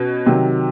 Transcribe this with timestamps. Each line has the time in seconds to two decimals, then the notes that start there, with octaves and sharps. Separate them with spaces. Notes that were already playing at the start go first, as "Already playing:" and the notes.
Already playing: B2 C#4
0.26 C3 D#3 F#3